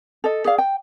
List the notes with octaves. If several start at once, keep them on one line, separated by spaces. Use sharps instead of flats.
A4 D#5
G#4 D5 F5
G5